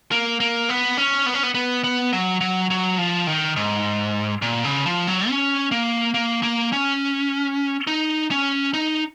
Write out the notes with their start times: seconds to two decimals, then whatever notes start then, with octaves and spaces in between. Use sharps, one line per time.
0.12 A#3
0.40 A#3
0.69 B3
0.97 C#4
1.26 B3
1.34 C#4
1.43 B3
1.54 B3
1.84 B3
2.13 F#3
2.41 F#3
2.70 F#3
2.98 F3
3.27 D#3
3.56 G#2
4.42 A#2
4.64 C#3
4.86 F3
5.07 F#3
5.29 C#4
5.72 A#3
6.14 A#3
6.43 A#3
6.73 C#4
7.87 D#4
8.31 C#4
8.74 D#4